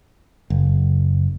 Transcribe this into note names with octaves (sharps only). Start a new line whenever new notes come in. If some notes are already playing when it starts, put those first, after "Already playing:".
F#1